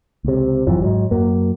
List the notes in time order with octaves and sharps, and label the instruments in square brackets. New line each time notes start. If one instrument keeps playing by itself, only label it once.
[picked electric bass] C#2 C3
G1 F#2 E3 F3
G#2 F#3
F#2 F#3 A#3